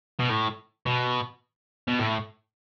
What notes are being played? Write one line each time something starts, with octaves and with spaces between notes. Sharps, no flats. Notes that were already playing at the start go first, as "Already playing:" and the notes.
B2
A2
B2
B2
A2